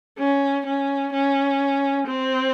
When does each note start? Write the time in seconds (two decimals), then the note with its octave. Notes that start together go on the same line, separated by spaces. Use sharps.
0.19 C#4
0.66 C#4
1.13 C#4
2.07 C4